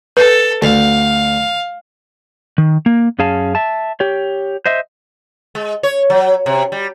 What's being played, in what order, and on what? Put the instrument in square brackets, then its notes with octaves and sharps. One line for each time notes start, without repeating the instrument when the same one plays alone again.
[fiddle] A4 [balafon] B4
[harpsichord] D2 [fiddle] F5
[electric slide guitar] D#3
A#3
F#2 C#4 G#4 F5 A5
E5 A5
G4 C#5
C5 D#5 E5
[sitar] G#3
C#5
F#3
C3
G3